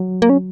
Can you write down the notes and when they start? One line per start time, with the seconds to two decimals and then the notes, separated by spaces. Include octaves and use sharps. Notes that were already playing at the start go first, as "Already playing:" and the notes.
Already playing: F#3
0.22 A#3
0.30 C#4